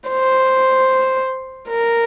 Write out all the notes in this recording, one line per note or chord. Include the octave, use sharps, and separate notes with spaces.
C5
A#4